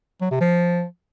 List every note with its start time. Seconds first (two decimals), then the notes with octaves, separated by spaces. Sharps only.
0.21 F#3
0.31 C3
0.40 F3